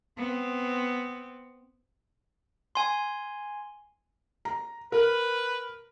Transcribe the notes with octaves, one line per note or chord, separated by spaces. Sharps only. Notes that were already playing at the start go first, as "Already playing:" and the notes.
B3 C4
G#5 C6
A#5
A#4 B4